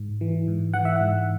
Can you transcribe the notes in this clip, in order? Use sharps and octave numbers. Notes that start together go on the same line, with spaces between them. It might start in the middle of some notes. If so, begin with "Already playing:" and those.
Already playing: G#2
E3
G#2
E3 F#5
E5
G#2 F#5